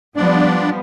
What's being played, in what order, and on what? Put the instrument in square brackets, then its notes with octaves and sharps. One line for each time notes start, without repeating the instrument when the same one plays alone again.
[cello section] F3 G3 B3 [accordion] D4 D5